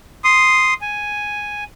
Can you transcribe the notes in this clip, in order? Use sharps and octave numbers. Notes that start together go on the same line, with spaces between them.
C6 D#6
G#5